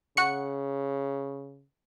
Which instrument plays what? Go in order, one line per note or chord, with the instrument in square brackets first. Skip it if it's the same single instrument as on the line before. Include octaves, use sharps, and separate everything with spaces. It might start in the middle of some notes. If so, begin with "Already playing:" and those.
[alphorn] C#3 [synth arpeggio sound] F#5 C#6 C#7